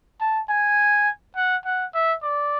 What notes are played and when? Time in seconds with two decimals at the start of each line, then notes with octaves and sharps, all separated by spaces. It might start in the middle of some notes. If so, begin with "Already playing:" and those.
0.21 A5
0.49 G#5
1.36 F#5
1.65 F#5
1.94 E5
2.23 D5